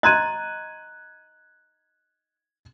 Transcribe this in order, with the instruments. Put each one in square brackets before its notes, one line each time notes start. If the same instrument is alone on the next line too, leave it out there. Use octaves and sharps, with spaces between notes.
[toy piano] D#5 A#5 C6 [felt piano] F#6 G#6 D#7